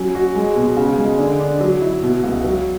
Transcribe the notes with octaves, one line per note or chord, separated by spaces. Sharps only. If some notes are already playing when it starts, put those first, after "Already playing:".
Already playing: F#3 C#4
F#4
G#3
B2
C#3
G#3
D3
D4
F#3
E4
B2
C#2
F#3